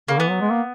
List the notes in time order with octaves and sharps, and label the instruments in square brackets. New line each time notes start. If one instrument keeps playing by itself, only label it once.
[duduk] C#3 [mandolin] A#3
[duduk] E3 [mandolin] B3
[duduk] F#3
G#3
A#3